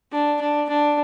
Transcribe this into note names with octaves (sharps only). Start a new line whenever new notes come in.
D4
D4
D4